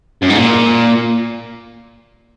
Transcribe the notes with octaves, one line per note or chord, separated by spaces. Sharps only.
F#2
G#2
A#2